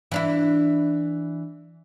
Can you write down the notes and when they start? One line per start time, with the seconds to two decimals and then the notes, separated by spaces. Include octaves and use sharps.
0.12 E3 D4 E4